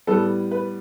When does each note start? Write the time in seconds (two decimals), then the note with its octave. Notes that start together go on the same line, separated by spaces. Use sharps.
0.07 A2 G3 B3 A4
0.51 B4